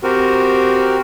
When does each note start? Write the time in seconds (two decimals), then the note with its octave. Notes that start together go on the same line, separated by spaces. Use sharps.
0.03 C4 F#4 G4 A#4